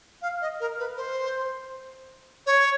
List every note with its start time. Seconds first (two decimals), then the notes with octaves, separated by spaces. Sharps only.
0.22 F5
0.42 D#5
0.60 A#4
0.79 B4
0.97 C5
2.46 C#5